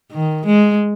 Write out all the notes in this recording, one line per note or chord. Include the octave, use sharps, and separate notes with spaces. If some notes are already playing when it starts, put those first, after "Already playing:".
D#3
G#3